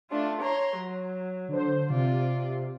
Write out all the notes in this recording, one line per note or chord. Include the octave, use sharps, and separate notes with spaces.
A3 D4 F4
C#5 A#5 C6
F#3
D3 C5
C3 F4 D5